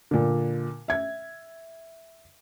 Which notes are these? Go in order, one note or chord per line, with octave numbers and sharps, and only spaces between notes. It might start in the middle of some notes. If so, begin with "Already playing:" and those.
A#2 D3
E5 G#6